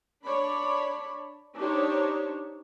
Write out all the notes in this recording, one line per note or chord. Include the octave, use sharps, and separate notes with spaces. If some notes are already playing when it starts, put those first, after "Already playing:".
D4 C#5 D5 B5
D4 D#4 G4 C5 C#5